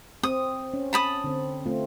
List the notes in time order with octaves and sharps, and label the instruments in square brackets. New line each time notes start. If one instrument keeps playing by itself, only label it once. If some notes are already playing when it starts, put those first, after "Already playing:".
[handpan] C4 [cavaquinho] D#6
[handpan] C#4
[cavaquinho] A5 B5 D#6
[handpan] D3 C4
A3 C4 F4